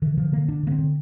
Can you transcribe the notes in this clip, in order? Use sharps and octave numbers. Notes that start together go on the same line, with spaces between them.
D3 E3
D3 F3
D3 A#3
D3 D4
D3 A#3
C4
D3